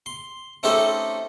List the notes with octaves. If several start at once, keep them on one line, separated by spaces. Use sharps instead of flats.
C6
A3 C4 C#4 D#4 G4 A4